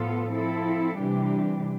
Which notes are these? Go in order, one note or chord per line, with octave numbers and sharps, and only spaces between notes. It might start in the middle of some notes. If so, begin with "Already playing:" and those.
Already playing: A2 F3 B3 F4 A4
F3 C4 E4 A4
C3 E3 G3 D4 G4